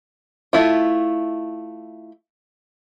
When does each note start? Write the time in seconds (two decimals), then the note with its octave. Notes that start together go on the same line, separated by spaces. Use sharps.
0.53 A3 E4 F4